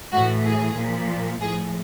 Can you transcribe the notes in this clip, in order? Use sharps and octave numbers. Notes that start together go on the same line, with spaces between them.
A2 E3 F#4
G#4
A#2 F3
A2 F3 G#4